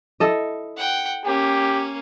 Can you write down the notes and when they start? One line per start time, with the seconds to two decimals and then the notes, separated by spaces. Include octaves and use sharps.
0.20 E4 A4 D#5
0.77 F#5 G5
1.25 A#3 C#4 G4